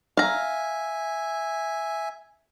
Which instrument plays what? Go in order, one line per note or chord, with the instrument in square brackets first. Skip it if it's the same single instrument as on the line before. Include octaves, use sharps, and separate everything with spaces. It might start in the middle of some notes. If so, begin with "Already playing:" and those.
[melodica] E5 G#5 [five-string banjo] F5 A#5